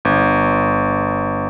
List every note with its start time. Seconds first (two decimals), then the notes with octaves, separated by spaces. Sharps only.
0.05 G1